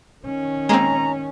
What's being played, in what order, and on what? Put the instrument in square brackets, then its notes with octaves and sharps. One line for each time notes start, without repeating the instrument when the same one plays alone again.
[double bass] D#3 C#4
[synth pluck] G#3 A#3 C4 [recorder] A#5